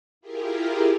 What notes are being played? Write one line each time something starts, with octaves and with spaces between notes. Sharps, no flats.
E4 F4 G4 G#4 A#4